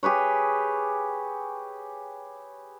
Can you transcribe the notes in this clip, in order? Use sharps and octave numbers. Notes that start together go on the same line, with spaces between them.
G4 G#4 B4 C#5